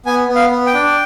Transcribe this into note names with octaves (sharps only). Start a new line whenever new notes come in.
B3 G#5
B3
F5
B3
G5
D4